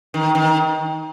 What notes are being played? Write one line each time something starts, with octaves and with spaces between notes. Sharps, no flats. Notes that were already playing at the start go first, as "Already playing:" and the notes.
D#3
D#3